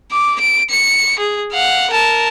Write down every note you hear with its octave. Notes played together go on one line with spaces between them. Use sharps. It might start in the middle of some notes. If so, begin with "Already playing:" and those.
D6
D7
C#7
G#4
F5 F#5
A#4 A5